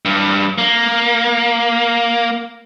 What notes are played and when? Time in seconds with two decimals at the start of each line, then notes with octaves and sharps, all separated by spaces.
0.05 G2
0.58 A#3